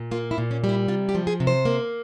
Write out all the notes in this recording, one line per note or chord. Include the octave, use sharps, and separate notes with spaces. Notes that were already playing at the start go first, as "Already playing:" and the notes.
Already playing: A#2
A#3 F4
E4
A#2
C#4
G3
E4
C3 F4
G4
F3
G#4
C3
C5
A#3